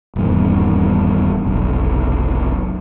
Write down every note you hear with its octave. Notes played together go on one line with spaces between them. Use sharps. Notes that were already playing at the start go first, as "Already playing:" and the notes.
D#1 E2 G2 B2
F1 B1